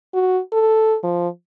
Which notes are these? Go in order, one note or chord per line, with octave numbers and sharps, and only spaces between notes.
F#4
A4
F3